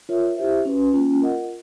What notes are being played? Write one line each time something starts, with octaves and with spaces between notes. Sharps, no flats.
F4 A#4 C#5 E5
E4 G4 C5 E5
C#4 F#4 B4
A#3 C#4 F4
F4 A#4 D#5 F#5